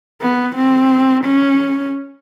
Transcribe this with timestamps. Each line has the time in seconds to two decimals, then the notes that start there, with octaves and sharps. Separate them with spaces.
0.22 B3
0.56 C4
1.24 C#4